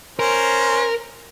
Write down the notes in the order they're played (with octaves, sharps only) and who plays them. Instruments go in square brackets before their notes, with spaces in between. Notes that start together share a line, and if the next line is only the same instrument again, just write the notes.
[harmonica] C#4 C5 [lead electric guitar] A#4